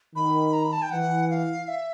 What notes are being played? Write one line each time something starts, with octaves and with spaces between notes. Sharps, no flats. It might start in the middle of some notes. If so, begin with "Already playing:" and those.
D#3 B5
A#5
B5
A5
G5
E3 F#5
F5
E5